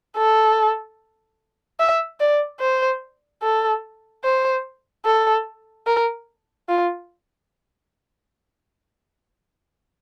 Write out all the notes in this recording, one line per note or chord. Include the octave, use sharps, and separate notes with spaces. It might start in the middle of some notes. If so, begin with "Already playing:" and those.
A4
E5
D5
C5
A4
C5
A4
A#4
F4